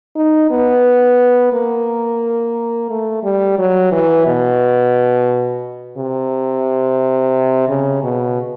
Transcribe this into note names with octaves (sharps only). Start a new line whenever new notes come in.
D#4
B3
A#3
A3
G3
F#3
E3
B2
C3
C#3
B2